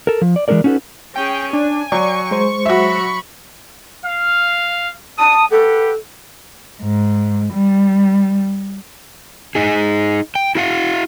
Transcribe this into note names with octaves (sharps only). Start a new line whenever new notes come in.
A4 A#4
F3
D5
E3 G#3 C#4 A4 A#4 D5
C#4 D#4 F#4 G#4 A4 B4
C#4 G#4 G5
D4 G#5
F#3 D5 C#6
G#3 C5
F#3 F#4 E5 B5
F5
A5 D#6
G4 A4 B4 F#5
G#2
G3
D#4 G#4
G5
E4 F#4 F5 F#5